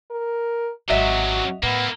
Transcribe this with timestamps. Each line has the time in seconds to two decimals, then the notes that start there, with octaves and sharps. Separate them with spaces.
0.10 A#4
0.90 G#1 C3 F#3 F#4 D#5 E5
1.63 A2 A#3 B3 E4